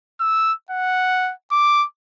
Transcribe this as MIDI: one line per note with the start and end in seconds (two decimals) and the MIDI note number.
0.20 0.53 88
0.71 1.32 78
1.52 1.85 86